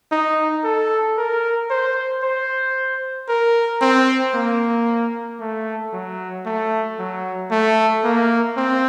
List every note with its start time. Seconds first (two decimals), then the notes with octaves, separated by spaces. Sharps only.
0.12 D#4
0.64 A4
1.17 A#4
1.70 C5
2.23 C5
3.29 A#4
3.81 C4
4.34 A#3
5.40 A3
5.93 F#3
6.45 A3
6.98 F#3
7.51 A3
8.04 A#3
8.57 C4